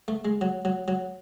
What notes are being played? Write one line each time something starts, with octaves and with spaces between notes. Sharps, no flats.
A3
G#3
F#3
F#3
F#3